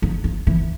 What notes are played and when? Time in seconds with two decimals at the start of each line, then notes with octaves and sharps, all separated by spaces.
0.02 F3
0.24 F3
0.47 E3